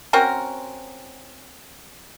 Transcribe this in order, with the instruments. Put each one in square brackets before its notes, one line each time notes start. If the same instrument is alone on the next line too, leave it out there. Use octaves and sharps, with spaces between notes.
[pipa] C4 C#4 F#4 A#4